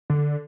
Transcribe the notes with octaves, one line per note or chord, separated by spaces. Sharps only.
D3